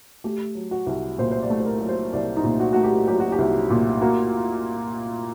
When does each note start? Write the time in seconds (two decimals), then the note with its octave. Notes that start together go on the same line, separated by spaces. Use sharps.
0.24 A3 G4
0.55 F#3
0.71 F#4
0.86 C2
1.18 A#2 C5
1.32 C5
1.42 D5
1.50 A3
1.60 C5
1.66 A#4
1.81 F#3
1.89 C5
2.13 C2 D5
2.37 D#4
2.44 A#2
2.60 F#4
2.73 A3 F#4
2.84 G4
3.07 F#3 G4
3.20 F#4
3.32 G4
3.38 C2
3.70 A#2
4.01 A#3 F#4